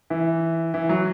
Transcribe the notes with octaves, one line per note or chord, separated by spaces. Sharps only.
E3
E3
F#3